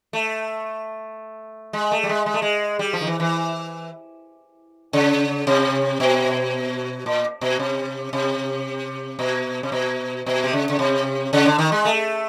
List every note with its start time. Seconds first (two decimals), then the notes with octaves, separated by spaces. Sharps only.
0.13 A3
1.73 G#3
1.92 A3
2.03 G3
2.09 G#3
2.26 G#3
2.34 A3
2.42 G#3
2.79 G3
2.93 F3
3.01 D#3
3.07 E3
3.20 E3
4.93 C#3
5.47 C3
6.00 B2
7.06 A#2
7.41 B2
7.59 C3
8.13 C3
9.19 B2
9.63 C3
9.72 B2
10.26 B2
10.44 C3
10.53 C#3
10.70 C#3
10.79 C3
11.33 C#3
11.45 D3
11.58 D#3
11.72 G#3
11.85 A3